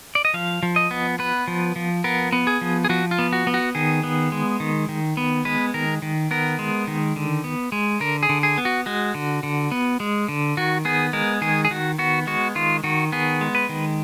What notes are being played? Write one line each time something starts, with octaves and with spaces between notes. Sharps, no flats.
D5
D#5
F3 F5
F3
D#5
B3
B3 B4
F3
F3
B3 A#4
B3
G#4
F3
G#4
F3 F#4
F4
B3
F#4
B3
F#4
D#3 G#4
B3
G#3
D#3
D#3
B3
G#3 B4
D#3 A#4
D#3
B3 A#4
G#3
D#3
D3
B3
G#3
D3 A#4
G#4
D3
G#4
B3
F#4
G#3 F#4
D3
D3
B3
G#3
D3
D#3 F#4
B3 G#4
G#3 A#4
D#3 G#4
G#4
D#3 F#4
B3 F#4
G#3 F#4
D#3 F4
D#3 F#4
B3 G#4
G#3
B4
D#3